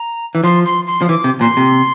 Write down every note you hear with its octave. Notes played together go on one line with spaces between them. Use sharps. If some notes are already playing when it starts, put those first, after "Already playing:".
Already playing: A#5
E3
F3 C6
C6
C6
F3
E3 D6
C3
A#2 C6
C3